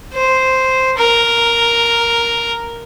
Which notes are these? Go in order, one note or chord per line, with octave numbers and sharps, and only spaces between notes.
C5
A#4